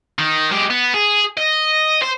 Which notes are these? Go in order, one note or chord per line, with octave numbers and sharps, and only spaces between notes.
D#3
G#3 G4
B3
G#4
D#5
C5